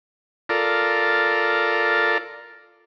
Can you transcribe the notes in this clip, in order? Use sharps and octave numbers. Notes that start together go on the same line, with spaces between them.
F4 A4 A#4 D5